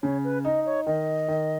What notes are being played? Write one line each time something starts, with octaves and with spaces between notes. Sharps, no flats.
C#3 C#5
B4
D#4 D#5
C#5
D#3 D#5
D#3